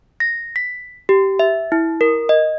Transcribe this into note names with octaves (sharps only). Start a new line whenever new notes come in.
A#6
B6
G4
E5
E4
A#4
D#5